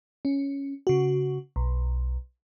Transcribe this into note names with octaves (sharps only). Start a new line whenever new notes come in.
C#4
C#3 F#4
B1